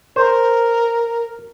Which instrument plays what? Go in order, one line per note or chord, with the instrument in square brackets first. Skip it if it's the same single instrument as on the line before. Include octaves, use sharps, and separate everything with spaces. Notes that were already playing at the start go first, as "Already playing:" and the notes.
[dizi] A#4 [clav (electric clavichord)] C5